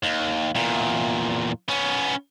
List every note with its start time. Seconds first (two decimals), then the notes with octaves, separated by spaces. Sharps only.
0.03 D#2
0.55 E2 A#2
1.68 B3 C#4